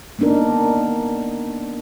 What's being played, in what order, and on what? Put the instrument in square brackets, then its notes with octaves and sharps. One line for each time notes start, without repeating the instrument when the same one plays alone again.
[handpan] A#3 B3 D4 D#4 A#4